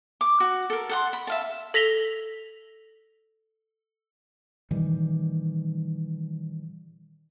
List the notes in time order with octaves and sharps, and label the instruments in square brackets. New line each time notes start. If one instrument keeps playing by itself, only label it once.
[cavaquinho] D6
F#4
A4 A#4
A4 F#5 C6
B5
E5 F5 A5
[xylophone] A4 A#6 B6 F7 G7
[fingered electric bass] A#2 D#3 E3 G3